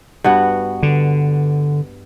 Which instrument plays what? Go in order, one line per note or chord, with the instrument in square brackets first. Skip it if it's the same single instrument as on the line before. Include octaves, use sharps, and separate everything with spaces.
[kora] G2 B3 F#4
[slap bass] D3